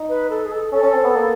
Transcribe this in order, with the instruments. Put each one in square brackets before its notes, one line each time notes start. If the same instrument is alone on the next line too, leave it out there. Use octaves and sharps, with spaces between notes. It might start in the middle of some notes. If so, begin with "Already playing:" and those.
Already playing: [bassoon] D#4
[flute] B4
A4
G#4
A4
[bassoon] C#4 [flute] A4
[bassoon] C#4
C4
B3
A#3